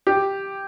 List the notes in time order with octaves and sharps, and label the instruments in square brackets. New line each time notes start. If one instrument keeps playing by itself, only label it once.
[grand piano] G4